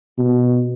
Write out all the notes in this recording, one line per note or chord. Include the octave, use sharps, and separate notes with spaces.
B2